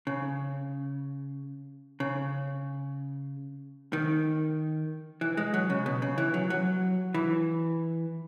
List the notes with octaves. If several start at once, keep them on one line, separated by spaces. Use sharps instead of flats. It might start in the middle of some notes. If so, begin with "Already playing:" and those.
C#3
C#3
D#3
E3
G#3
F#3
C#3
B2
C#3
E3
F#3
F#3
E3